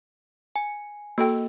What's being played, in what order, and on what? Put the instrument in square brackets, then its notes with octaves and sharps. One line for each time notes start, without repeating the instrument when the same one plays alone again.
[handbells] G#5
[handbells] A#3 [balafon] F#4 A4 G5